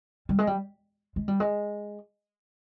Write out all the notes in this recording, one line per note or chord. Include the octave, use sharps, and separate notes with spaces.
G3
G#3
G3
G#3
G3
G#3